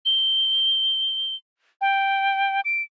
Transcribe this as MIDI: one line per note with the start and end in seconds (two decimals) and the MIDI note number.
0.06 1.35 103
1.81 2.61 79
2.65 2.82 98